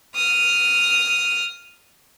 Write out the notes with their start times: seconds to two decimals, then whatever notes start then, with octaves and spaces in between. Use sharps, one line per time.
0.15 D#6 F6